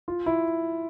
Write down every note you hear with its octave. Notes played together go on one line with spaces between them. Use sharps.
F4
E4